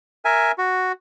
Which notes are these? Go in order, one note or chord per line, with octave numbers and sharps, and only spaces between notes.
A#4 E5 G#5
F#4